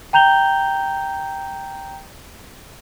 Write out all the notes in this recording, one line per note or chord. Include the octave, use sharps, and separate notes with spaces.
G5 A#5 G6 F7 G7